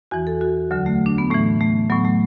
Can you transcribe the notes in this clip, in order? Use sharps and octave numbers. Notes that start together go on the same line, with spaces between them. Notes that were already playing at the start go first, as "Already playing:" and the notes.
E2 E3 F#4
A4
F#4
D2 D3 F#3
A3
D4
B3
A2 E3 A3
A3
A2 F#3 B3
A3